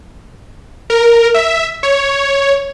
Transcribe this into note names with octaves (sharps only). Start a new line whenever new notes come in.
A#4
E5
C#5